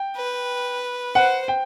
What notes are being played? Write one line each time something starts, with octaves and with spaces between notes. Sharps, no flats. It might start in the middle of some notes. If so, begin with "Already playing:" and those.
Already playing: G5
B4
C5 F#5
G5